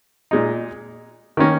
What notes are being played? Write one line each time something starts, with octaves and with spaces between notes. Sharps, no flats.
A#2 G#3 D#4
D#3 A#3 C#4